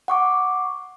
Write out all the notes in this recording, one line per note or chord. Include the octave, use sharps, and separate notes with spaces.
F#5 C#6 D6